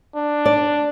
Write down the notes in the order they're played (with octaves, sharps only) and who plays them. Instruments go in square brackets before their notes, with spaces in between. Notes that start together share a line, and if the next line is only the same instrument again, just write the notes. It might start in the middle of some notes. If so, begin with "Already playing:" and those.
[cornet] D4
[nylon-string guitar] D5